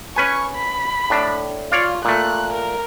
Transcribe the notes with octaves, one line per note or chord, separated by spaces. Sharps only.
C#4 B4 G#5 C#6
B5
A2 D4
F4 C#5 D5 F5
A#2 A3 F#6
A#4